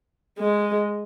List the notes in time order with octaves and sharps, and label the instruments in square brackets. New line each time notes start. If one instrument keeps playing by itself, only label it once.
[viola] G#3